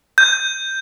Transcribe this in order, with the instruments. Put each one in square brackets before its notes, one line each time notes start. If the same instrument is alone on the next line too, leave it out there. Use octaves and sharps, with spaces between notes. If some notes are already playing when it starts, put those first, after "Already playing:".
[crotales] G6